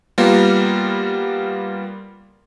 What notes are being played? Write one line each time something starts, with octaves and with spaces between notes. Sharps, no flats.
G3 A#3 B3 F4 A#4